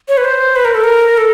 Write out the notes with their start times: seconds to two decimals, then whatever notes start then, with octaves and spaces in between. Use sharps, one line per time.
0.09 C#5
0.17 B4
0.24 C5
0.56 B4
0.65 A#4
0.75 A4
0.84 A#4
1.18 A4